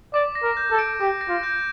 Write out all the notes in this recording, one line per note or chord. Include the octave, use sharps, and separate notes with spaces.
D5 D6
A#6
A#4
G6
A4
D7
G4 D6
A#6
F4
G6